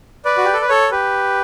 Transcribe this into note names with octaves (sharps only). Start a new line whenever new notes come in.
B4 D5
F#4
G4
A4
B4
A4 C#5
G4 B4